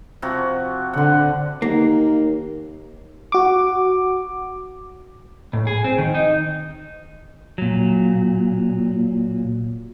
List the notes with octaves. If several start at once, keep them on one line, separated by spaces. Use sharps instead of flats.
C3 F3 F#4
D3 F#5 C6
D#2 A#3
F#4 D6
A2
G#4
C4
D#3
D#4
A#2 F#3